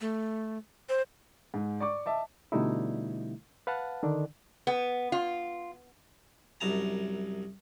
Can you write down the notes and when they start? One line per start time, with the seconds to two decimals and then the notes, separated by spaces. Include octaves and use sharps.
0.01 A3
0.89 C5
1.54 G#2
1.80 D5 C#6 D6
2.06 D#5 E5 A5 D6
2.52 B2 D3 G3 A3 D#4 E4
3.67 B4 F5 F#5 A5
4.03 D3 D#3 D4
4.67 B3
5.12 F4
6.61 C2 F#2 A5 A#5